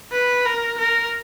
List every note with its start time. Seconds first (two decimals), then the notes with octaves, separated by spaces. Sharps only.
0.12 B4
0.46 A#4
0.78 A#4